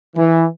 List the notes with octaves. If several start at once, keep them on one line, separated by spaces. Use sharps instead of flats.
E3